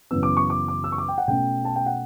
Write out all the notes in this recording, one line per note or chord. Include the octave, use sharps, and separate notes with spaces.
F#2 C#3 E3 B3 E6
D6
C#6
D6
D6
E6
C#6
D6
G5
F#5
B2 A3 C#4 G5
A5
G5
F#5